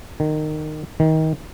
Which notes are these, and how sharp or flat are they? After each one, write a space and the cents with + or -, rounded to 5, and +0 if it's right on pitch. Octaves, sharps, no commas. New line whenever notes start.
D#3 -20
D#3 +25